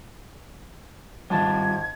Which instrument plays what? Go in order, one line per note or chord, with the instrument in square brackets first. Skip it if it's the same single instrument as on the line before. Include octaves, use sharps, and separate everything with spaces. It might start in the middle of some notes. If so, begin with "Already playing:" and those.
[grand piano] G#1 A5 A6 [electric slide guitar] G3 C4 F4 [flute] G#6